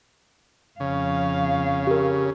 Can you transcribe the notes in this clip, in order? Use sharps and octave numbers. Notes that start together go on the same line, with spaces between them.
F2 C#3 F5
G4 A#4